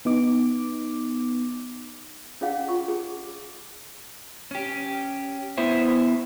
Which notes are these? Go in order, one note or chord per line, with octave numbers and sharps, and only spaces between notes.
B3 D#4 D6
C#4 G#4 C#5 F5 F#5
F4 C#6
G#4
C#4 G4
B3 E4 C5 E5